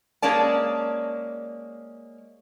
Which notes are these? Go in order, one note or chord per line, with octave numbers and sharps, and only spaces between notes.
G#3 A#3 C#4 D5 A5